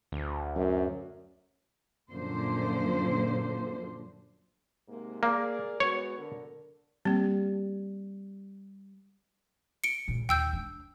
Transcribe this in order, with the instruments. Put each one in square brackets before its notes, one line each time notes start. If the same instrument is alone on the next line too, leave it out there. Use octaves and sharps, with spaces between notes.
[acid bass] D2
[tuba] F#2
[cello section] F#2 A#2 D3 F3 C5
[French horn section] G#2 C3 A#3
[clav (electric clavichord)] A#3 [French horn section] G#4 A#4 D5
[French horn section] G#3 B3 F#4 [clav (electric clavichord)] C#5
[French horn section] D3 A#4
[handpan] G3 [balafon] A#3 C4
[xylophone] C#7 D7
[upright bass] A#2 C#3
[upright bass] D#2 [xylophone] G5 E6 G6
[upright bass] D4